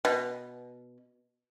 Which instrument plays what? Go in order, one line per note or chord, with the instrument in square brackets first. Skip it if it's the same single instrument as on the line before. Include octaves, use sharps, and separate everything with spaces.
[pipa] B2